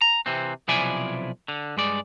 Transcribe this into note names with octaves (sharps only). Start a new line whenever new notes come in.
A#5
C3 E3 C4
B1 C3 F3 E4 D5 G#5
D3
G2 G#3 D5